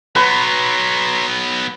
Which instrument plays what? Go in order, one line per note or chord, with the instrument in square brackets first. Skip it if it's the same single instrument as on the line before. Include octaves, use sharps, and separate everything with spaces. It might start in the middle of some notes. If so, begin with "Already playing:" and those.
[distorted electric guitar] F#3 B3 [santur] B4 [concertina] C#5 A#5 C6